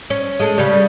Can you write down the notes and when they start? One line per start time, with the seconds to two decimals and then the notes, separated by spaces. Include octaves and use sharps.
0.10 C#4
0.39 G#3 A3
0.58 C#3 G3